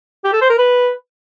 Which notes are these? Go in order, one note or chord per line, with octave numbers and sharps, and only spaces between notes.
G4
A4
C5
A#4
B4